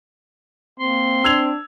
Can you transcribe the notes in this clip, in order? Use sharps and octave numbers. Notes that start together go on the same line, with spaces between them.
A#3 C4 C6
D4 E6 G#6 F7